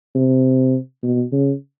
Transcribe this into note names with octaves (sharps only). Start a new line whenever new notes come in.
C3
B2
C#3